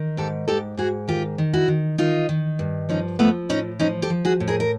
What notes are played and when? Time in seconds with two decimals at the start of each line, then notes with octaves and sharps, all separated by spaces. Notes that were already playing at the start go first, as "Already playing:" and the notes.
Already playing: D#3
0.17 G#2 G4 A4
0.48 G#2 G4 A4
0.77 G#2 F#4 G#4
1.08 D#3 F4 G4
1.38 D#3
1.53 E4 F#4
1.68 D#3
1.98 D#3 D#4 F4
2.29 D#3
2.59 G2
2.89 F3 C#4 D#4
3.19 F3 A3 B3
3.49 A2 C#4 D#4
3.79 F3 C#4 D#4
4.02 G4 A4
4.10 F3
4.25 F#4 G#4
4.40 A2
4.48 G#4 A#4
4.60 A#4